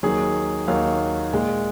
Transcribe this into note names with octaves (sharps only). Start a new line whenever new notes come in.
D#2 D#3 F#3 G#4
D#2 D#3 F#3 F5
A#2 G#3